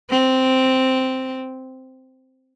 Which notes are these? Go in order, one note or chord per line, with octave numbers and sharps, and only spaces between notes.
C4